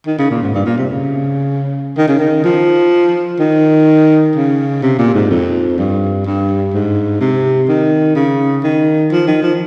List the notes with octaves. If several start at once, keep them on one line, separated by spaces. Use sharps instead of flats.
D#3
C#3
A#2
G#2
G2
A#2
C3
C#3
D#3
C#3
D#3
F3
D#3
C#3
C3
A#2
G#2
F2
G2
G2
G#2
C3
D#3
C#3
D#3
F3
D#3
F3